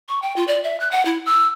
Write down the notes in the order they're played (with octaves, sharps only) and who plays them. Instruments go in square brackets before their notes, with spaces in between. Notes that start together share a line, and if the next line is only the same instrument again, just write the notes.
[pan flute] C#6
G5
F4
D5
E5
F#6
F#5
E4
E6